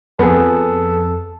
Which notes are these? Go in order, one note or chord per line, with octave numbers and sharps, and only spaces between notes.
F2 B3 G#4 A4